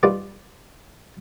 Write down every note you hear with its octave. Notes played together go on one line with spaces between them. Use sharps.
G3 D#4 F4 G4 B4 D5